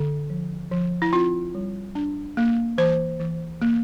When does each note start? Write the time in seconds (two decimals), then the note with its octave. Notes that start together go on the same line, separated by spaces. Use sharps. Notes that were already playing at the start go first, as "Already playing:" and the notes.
Already playing: D3
0.30 F3
0.71 F3
1.02 E4
1.13 C4 F4
1.55 G3
1.95 D4
2.37 A#3
2.78 E3 C5
3.19 E3
3.62 A#3